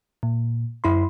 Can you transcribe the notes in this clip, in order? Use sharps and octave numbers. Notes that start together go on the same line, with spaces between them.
A#2
F#2 E4 B5 C6